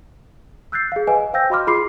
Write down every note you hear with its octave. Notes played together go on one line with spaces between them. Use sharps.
E6 F#6 G6 A6 C7
G#4 F5
B4 D#5 G#5
C5 F5 G5 E6 G6 A#6
F#4 D#5 B5 C6 D6 F6
F4 G#4 B5 C6 D6 C7